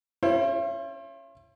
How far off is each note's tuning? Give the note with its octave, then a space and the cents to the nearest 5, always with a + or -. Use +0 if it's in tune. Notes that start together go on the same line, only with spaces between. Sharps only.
C#4 -10 E4 +45 C5 +40